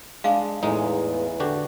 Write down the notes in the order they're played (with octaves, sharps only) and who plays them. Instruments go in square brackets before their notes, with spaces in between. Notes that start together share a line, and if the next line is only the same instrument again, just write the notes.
[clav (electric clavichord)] G#3 D4 [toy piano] F5
[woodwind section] E2 [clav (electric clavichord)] A2 G#3 D#4
[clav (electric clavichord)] D3 F#4 G4